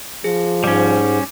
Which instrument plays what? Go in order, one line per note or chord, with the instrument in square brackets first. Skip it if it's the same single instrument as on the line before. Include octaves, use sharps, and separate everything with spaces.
[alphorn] F3 [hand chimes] G#4
[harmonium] G#2 [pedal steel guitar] G3 C#4 [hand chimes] D6